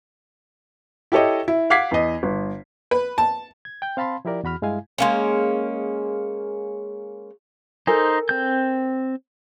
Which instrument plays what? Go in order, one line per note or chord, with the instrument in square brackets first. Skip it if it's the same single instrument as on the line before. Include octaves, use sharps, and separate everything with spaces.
[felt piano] E4 G4 A4 C#5 D#5
E4
F5 F#5 D6 G#6 B6 C7
E2 D#5
G1
[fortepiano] B4
A5
[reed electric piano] G#6
G5 G6
C4 F5 A5 B5 C6
F3 E4 G4 A#4 D5
E2 F#4 B5 F6
G2 G#3 E4 F5 G#5
[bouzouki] G#3 A#3 C#4
[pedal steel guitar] D#4 C5 [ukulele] A4 A#4 G#5
[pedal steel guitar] C4 G6